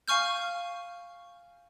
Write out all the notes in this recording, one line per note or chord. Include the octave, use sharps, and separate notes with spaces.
F5 G#5 C#6 F6 G6